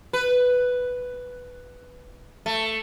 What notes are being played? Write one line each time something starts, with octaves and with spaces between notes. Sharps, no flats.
B4
A3